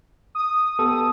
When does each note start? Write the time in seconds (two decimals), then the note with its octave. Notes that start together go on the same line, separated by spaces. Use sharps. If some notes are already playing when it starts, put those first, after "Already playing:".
0.35 D#6
0.79 B3 G4 A4